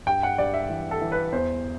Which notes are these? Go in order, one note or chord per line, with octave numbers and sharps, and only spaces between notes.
G2 G5
F#5
G2 D5
E5
E3
A4
E3
B4
E2 C5